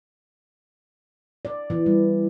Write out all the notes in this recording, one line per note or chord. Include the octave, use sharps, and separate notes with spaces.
D5
E3
G3